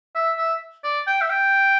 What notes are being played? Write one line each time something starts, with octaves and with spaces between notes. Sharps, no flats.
E5
E5
D5
G5
E5
G5